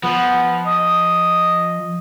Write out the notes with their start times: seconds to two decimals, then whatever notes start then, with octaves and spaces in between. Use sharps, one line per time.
0.04 F3 B3
0.67 D#5